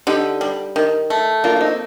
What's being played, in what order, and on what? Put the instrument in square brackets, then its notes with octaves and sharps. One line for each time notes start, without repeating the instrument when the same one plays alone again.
[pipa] D3 [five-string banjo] D#4 G4
[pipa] G3
D#3
A3
[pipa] A#3 [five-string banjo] D4 F4
[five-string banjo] F4
C4 D#4